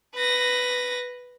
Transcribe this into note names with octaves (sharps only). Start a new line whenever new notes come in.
B4 A#6